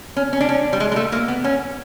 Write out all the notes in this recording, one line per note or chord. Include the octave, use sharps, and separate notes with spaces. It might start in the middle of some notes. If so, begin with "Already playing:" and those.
C#4
C#4
D4
C#4
G3
G#3
G#3
A3
A#3
B3
C#4